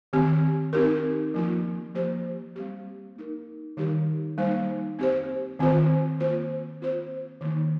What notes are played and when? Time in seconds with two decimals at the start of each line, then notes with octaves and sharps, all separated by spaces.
0.13 D#3 C4 G4
0.73 C4 D#4 G4 A#4
1.34 F3 A#3 F4
1.95 F3 A#3 G4 C5
2.56 G3 C4 G4
3.16 A#3 D#4 A#4
3.77 D#3 G3 D#4 G4 A#4
4.38 G3 A#3 D#4 C5
4.99 C4 G4 C5
5.59 D#3 C4 F4 C5
6.20 A#3 F4 C5
6.81 C4 F4 C5
7.41 D#3 A#3 D#4